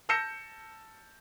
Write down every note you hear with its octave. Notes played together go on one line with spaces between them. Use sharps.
A5 E6 G6 A#6 C#7 E7